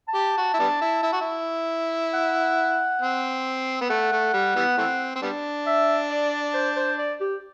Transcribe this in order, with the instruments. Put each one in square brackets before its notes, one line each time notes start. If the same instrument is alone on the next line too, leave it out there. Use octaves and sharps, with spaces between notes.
[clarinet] A5
[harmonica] G4
F#4
E4
G3 B3 D4
E4
E4
F#4
E4
[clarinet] F#5
[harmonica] C4
B3
[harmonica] A3 [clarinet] F#5
[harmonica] A3
G3
E3 G3 B3
E3 A3 C4
C4
G3 B3 D4
[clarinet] E5
D5
C5
C5
D5
G4